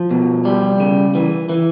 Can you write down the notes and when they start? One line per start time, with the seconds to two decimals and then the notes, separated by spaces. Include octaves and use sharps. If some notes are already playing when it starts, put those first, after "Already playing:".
Already playing: F3
0.11 B2
0.45 G3
0.80 C#3
1.15 E3
1.49 E3